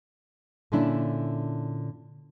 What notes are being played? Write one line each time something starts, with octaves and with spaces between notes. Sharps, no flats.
A#2 D3 C#4 D4 E4